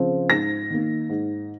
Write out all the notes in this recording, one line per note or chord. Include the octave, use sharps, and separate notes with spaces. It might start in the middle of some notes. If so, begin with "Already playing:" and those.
Already playing: C#3 F3 C4
G#2 A#6
D#3 A#3
G#2